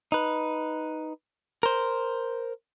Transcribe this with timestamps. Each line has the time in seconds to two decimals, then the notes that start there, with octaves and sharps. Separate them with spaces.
0.12 D#4 B4
1.63 A#4 C5